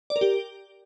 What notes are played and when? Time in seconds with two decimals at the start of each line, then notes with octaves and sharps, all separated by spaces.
0.10 D5
0.16 A#4
0.21 G4